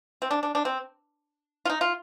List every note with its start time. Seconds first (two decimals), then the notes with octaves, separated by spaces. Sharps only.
0.22 C4
0.31 D4
0.43 D4
0.55 D4
0.65 C4
1.65 F4
1.70 D#4
1.81 F4